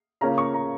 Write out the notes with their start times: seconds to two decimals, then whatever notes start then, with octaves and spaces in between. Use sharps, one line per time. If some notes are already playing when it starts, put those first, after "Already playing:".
0.21 C#3 A#3 C#4 F4 A#5
0.38 C#6
0.54 A#5